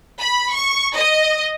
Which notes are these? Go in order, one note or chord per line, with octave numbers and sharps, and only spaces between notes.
B5
C#6
D#5